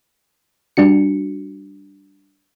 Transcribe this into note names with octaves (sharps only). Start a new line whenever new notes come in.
G3 D4 F#4 C#7